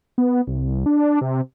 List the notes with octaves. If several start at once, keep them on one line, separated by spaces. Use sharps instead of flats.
B3
C2
D4
C3